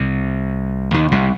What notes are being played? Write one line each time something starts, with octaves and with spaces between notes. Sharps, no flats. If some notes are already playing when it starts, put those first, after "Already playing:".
Already playing: C2 C3
D#2 D#3
C2 C3